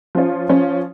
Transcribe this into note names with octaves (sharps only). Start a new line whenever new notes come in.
F3 C#4 F4 C#5
F3 C#4 F4 C#5